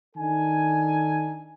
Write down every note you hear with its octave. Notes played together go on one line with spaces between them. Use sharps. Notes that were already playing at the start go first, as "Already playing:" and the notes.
D#3 D4 D#4 A4 G#5